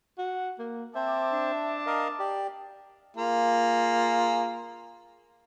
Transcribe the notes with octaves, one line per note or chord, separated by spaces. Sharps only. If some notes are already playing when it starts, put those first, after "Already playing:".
F#4
A#3
C4 C5 E5 A5 D6
D4
A#4 D#5 F5
G4 D5
A#3 F4 G#4